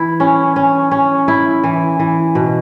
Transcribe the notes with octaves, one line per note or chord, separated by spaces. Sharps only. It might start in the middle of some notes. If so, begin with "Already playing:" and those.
Already playing: E3 E4
C#4
C#4
C#4
E4
E3
E3
B2